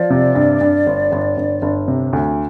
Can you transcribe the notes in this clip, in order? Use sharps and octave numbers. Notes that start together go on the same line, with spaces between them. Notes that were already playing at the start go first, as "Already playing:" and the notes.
Already playing: F3 D5
C3
G2
G2
G1
G1
G1
G1
C3
D2